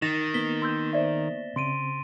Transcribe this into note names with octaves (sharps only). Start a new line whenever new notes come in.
D#3 D#4 A6 A#6 E7
A#3 B3 B6 G7
C6 E6 G6
C5 D5 E5
C#3 C4 C6 D7 D#7